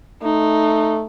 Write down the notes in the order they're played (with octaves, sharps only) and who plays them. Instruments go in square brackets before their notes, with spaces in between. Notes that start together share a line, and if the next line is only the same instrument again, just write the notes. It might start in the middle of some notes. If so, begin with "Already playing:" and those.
[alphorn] A3 [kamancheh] D#4